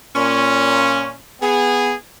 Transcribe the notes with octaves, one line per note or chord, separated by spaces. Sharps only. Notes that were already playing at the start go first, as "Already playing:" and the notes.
A#2 C#4
B3 G#4